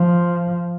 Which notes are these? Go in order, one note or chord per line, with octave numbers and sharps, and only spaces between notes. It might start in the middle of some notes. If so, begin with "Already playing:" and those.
Already playing: F3